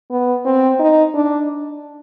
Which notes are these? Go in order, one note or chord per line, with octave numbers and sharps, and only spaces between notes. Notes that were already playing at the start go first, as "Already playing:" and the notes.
B3
C4
D#4
D4